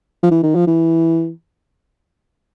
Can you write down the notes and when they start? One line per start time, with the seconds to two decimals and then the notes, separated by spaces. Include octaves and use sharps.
0.23 F3
0.32 E3
0.43 D#3
0.55 F3
0.67 E3